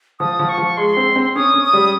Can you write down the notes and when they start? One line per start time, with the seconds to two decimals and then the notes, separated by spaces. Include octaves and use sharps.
0.20 F3 D#6
0.39 F3
0.49 C#6
0.58 F3
0.77 G#3 C6
0.97 C4
1.16 C4
1.35 C#4 D#6
1.54 C#4
1.65 D#6
1.73 G3